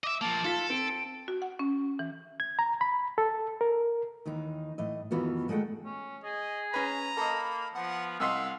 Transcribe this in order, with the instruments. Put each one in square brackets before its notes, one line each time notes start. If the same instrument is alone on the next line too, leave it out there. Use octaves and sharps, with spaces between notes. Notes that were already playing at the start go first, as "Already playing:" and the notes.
[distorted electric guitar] D#5 E5 [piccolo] D6
[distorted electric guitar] F3 A#3 [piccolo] A5
[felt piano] F4 B6 [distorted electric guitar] A4
[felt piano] C4 [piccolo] D7
[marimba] F#4
F#5
C#4
E3
[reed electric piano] G#6
A#5
B5
A4
A#4
[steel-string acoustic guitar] D#2 D#3 E3 D#4
A2 E3 D#5
F2 D#3 E3 B3 F4 F#4
D#3 G#3 A3 C#5 F#5 G5
[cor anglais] C#4
[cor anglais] G#4 [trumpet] D#5
[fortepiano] C#4 B4 [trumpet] A#5
[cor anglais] A#3 [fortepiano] A4 D#5 [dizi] B5
[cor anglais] F3 [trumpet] B3 [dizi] F#5
[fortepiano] C2 D#5 C6 [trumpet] F5 [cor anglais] F#5 [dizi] E6